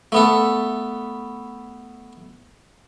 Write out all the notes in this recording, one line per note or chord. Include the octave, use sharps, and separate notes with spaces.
A3 B3 A4